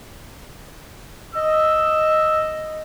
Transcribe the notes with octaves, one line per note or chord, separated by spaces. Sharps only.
D#5 E6